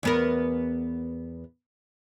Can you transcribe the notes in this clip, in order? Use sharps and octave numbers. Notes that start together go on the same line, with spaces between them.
E2 B3 A#4